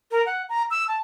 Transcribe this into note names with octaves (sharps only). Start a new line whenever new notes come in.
A#4
F#5
A#5
E6
A5